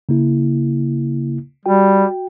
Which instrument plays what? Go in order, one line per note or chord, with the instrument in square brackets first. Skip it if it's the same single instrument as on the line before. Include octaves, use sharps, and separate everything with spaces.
[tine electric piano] C#3 A#3 E4
[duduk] G3 [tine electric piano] F#4 G5